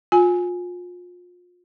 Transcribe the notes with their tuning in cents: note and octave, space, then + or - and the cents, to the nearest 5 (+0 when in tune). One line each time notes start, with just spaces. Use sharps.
F4 +30 G#5 +0